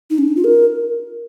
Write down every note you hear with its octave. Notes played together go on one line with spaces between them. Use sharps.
D#4
C#4
D#4
F4
A#4